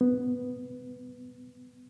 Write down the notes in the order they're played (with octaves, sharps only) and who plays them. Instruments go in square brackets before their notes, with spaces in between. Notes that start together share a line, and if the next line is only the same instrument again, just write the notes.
[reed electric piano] B3